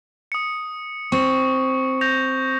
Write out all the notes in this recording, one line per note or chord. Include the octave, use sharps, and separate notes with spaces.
D#6 C#7
C4 C#6 C#7
G6 A#6 F7